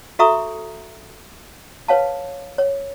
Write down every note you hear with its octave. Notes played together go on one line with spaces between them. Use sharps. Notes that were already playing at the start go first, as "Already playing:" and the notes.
F#4 A4 E5 A#5 C#6 D#6
B4 C#5 F5 A5
C#5